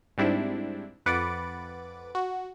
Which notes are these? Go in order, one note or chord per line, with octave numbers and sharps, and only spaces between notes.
G#2 G3 C4 D4 E4
F2 B4 F#5 D6 A6 D7
F#4